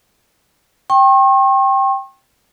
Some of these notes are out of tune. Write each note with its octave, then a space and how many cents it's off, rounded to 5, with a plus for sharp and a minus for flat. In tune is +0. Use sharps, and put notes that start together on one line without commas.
G5 +0 C#6 -45